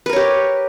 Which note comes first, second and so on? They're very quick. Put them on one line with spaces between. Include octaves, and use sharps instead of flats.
B4 A#4 C#5 G4